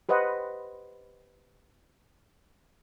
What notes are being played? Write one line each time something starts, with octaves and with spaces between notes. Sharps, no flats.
G4 B4 C5 D#5 F#5